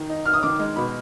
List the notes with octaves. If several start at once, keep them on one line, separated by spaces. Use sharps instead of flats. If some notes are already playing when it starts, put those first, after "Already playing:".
Already playing: D#3
D#4
D#4 F6
D#6
D#3 D6
G#3
B2 B5